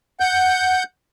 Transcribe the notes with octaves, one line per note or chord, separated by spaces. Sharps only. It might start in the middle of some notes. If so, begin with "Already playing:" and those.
F#5 G6